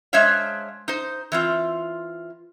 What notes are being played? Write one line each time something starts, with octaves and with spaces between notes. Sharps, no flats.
G#3 D4 C5 C#5 E5 F5
D#4 C5
E3 C4 F4